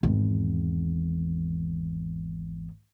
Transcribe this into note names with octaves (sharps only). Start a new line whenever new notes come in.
G#1 E2